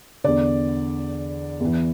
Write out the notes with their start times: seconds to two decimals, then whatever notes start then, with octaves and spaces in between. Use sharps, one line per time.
0.24 E2 D3 D5
1.60 E2 E3